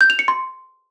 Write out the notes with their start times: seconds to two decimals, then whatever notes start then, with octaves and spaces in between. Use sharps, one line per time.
0.01 G6
0.10 F7
0.19 C#7
0.28 C6